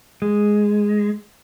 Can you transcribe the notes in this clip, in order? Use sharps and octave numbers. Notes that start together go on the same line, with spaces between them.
G#3